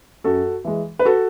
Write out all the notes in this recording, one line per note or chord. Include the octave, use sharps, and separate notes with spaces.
F#2 F#4 A4
E3 G#3
B4
F#4 A4